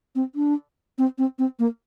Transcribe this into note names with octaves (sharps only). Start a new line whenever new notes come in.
C4
D4
C4
C4
C4
A#3